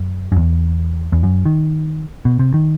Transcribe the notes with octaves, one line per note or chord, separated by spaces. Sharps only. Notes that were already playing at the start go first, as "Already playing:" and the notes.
Already playing: F#2
F#2
E2
E2
F#2
D#3
B2
C3
D#3